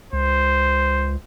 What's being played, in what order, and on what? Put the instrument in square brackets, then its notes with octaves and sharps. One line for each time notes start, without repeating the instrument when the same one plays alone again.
[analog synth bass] C#2 [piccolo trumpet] C5